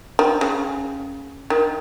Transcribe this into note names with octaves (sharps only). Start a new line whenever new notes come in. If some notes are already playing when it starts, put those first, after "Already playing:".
D#3
C#3
D#3